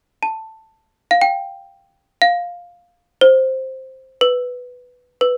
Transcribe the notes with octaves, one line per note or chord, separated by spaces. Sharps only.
A5
F5
G5
F5
C5
B4
B4